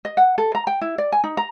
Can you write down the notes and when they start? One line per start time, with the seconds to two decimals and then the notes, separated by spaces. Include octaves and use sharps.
0.05 D#5
0.17 F#5
0.38 A4
0.55 A#5
0.67 G5
0.81 E4
0.98 D5
1.12 G#5
1.24 D#4
1.37 A#5